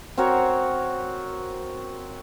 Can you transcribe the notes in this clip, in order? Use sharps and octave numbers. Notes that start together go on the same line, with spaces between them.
C4 F#4 A#4 C#5